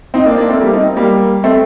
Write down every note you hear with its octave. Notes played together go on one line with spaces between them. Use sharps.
C4 D#4
A#3 D4
A#3 D4
A3 C4
G3 A#3
C4 D#4
G3 A#3
A3 C4